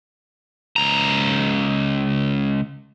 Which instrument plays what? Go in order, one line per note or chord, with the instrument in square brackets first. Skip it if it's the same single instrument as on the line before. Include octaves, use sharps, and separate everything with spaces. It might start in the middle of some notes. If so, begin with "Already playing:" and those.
[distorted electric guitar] C#2 A#5